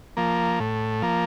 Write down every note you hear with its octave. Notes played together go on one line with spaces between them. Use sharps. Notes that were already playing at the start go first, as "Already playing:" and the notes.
F3 A#3
A2
F3 A#3